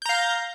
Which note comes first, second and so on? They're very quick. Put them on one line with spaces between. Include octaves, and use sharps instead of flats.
G6 A#5 F5